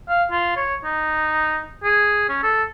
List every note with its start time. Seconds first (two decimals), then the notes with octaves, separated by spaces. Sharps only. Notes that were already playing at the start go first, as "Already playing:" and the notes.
0.09 F5
0.31 F4
0.56 C#5
0.85 D#4
1.84 G#4
2.29 C#4
2.43 A4